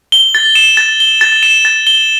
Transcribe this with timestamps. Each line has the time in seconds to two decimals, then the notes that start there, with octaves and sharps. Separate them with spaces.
0.12 G7
0.35 A6
0.55 E7
0.77 A6
1.00 G7
1.21 A6
1.43 E7
1.65 A6
1.87 G7